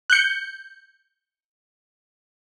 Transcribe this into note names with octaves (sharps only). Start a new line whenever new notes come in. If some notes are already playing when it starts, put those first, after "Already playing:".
F#6 G6 C#7